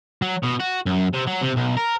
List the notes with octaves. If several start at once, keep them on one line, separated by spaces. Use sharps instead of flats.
F#3
B2
F#4
F#2
C3
F#3
C3
B1
A#4